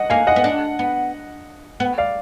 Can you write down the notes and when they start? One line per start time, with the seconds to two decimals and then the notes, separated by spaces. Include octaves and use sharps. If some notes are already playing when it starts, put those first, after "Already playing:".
Already playing: D#5 F#5
0.10 A#3 F5 G#5
0.27 D#5 F#5
0.36 B3
0.44 D4
0.79 B3
1.80 B3
1.98 D5 F5